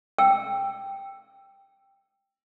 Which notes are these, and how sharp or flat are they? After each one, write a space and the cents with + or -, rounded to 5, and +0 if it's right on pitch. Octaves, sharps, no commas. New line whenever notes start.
G5 +0 E6 +20